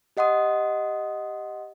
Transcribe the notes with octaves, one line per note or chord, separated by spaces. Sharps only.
G4 D#5 F#5 C6 D#6